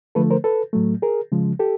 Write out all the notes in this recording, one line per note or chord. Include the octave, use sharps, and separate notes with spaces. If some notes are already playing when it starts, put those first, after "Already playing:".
D3 F3 A3 A4 B4
A#4 C5
A4 B4
A2 F#3 A3
G#4 A#4
C#3 F3 G#3
G4 A4